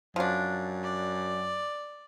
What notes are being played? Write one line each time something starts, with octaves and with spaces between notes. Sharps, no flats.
F#2 F3 D4
D5